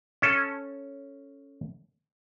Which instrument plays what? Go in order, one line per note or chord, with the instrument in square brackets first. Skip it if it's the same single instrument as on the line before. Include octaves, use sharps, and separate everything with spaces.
[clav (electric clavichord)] C#4 A4